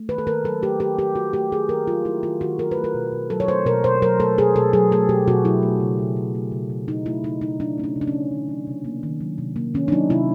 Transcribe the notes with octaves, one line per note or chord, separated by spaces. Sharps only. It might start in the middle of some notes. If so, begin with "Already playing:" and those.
Already playing: A3
D#3 B4
A4
D#3 A#4
F#3 A4
A3 G4
D#3 G4
D#3 G4
F#3 F#4
A3 G4
D#3 G#4
D#3 A#4
F#3 F4
A3 E4
D#3 F4
D#3 F#4
F#3 A#4
B4
A3
A#4
B2
B2
F#3 A4
C#5
A3 C5
B2 A#4
B2 C5
F#3 A#4
A3 A4
B2 G#4
B2 A4
F#3 G#4
A3 A4
B2 G4
B2 F#4
F#3 E4
A3
C#3
C#3
F#3
A3
C#3
C#3
F#3 D#4
A3 E4
C#3 D#4
C#3 D#4
F#3 D4
A3 C#4
D4
C#3
D4
C#4
C#3
D#3
F#3
C3
A#3
D#3
F#3
C3
A#3
D#3 C#4
D4
F#3 D#4
C3 E4